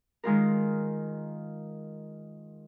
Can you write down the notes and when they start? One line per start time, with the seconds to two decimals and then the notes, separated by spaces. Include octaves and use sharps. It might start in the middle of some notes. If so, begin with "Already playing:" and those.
0.24 D#3 G#3 F4 A#4